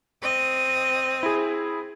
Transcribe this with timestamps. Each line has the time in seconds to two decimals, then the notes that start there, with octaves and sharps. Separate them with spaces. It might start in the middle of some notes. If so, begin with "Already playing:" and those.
0.22 C4 D#5
1.23 E4 G#4